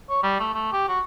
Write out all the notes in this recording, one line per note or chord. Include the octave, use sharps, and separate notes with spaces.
C#5
G3
A3
A3
G4
F#4